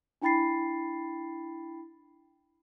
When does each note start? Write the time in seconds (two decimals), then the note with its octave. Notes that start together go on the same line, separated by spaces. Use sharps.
0.22 D4 E4 G5 B5 A6 C7